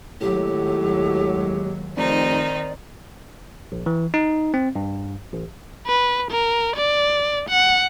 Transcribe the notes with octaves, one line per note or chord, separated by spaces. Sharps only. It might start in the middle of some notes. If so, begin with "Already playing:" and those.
D#2 A2 F#3 G#3 G4
F1 D#3 C4 D#4 D5
A#1
E3
D#4
C4
G2
A1
B4
A#4
D5
F#5